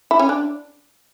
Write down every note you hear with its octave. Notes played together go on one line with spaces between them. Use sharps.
E4
C#4
D4